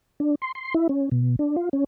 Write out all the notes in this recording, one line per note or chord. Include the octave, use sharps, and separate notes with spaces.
D4
C6
C6
E4
C#4
B2
D4
F4
C#4